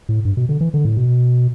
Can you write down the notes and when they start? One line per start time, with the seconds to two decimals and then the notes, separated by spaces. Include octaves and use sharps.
0.09 A2
0.25 G2
0.37 B2
0.49 D3
0.61 E3
0.74 D3
0.85 A2
0.97 B2